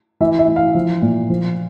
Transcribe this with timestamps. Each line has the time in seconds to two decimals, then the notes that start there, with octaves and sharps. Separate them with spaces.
0.21 E3 E5
0.39 E5
0.48 E3
0.56 F5
0.75 F3
1.02 A#2
1.30 F3